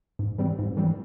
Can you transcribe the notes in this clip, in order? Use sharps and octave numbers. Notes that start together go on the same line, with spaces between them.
G#2
E3 G3 C4
G#2
E3 G3 C4